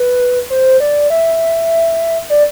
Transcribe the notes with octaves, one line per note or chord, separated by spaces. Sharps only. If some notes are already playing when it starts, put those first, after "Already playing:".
Already playing: B4
C5
D5
E5
D5